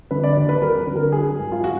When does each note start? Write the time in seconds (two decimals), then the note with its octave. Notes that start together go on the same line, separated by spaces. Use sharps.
0.11 D3 B4
0.24 D5
0.36 D#2
0.49 B4
0.62 F#3 A#4
0.87 D3
0.95 A#4
1.12 F#3 G#4
1.39 G#2
1.52 F4
1.64 F#4